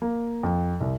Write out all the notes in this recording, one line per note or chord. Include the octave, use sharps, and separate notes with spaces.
A#3
F2
C2